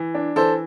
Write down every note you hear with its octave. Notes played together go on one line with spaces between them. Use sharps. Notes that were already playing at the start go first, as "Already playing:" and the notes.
Already playing: E3
D4
E3 A4 C5